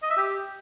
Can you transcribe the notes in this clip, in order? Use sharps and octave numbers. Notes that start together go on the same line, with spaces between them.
D#5
E5
G4